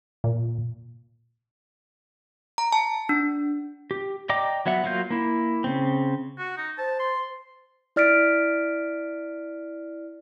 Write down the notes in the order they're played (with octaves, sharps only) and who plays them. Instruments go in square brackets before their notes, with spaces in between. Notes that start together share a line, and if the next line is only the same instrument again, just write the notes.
[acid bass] A#2
[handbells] A#5
A5
D4
[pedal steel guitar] G4
D5 D#5 G5 A#5 D6
F#3 B3 E5 F#5
F#3 A#3 F4 G6
A#3 E4
C#3 C4
[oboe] F#4
D#4
[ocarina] C5 [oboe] A5
[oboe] C6
[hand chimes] E4 D5 F6 A6 B6 D7